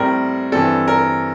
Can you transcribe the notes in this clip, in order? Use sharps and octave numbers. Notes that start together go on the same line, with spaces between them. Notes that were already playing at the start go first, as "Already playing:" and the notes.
Already playing: A2 G3 C4 A#4
G2 E3 G3 C4 A4
A#4